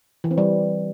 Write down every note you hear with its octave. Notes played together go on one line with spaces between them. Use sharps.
E3
C4
G3